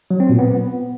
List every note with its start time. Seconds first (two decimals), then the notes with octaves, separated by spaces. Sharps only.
0.11 F#3
0.20 C4
0.29 A#2
0.39 B3